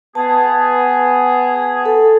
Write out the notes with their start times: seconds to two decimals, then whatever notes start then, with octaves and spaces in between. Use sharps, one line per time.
0.15 B3 G#4 A5
1.86 A4